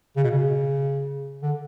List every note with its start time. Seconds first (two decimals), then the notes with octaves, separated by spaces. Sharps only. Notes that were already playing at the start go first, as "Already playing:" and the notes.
0.17 C#3
0.24 B2
0.31 C#3
1.42 D3